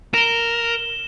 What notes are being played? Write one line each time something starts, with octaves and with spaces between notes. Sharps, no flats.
A#4 E7 G7